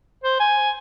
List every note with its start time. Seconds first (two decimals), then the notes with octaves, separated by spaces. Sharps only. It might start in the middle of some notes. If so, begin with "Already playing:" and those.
0.24 C5
0.40 G#5